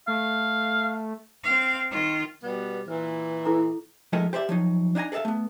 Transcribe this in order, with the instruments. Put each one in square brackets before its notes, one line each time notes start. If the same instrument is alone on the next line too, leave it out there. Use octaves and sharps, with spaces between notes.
[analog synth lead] A3 [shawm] F5
[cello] C4 F5
D#3 F4
[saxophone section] B2 G3 B3
[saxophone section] A#2 E3 [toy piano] B4
[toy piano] E4 A4 A#5
[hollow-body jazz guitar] F3 G#3 A3 D#4 A4 A#4
G4 C5 D5 E5
F3 F#3 D#4
D4 D#4 E5 G#5 A#5
G#4 A4 D5 E5 F5
A3 B3